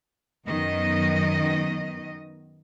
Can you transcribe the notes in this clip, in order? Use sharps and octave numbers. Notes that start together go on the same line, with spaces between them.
F#2 D#3 B3 D#5